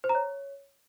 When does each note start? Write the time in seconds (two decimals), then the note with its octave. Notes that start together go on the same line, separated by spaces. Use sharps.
0.04 C5
0.09 A#5
0.15 C#5